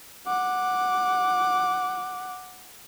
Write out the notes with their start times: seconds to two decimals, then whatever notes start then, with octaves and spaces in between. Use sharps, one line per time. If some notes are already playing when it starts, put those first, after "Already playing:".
0.27 F#5 D6